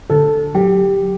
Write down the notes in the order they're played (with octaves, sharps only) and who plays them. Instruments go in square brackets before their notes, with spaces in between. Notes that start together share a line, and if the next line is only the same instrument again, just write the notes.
[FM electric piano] D3 [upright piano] A4
[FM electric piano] F#3 [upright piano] G4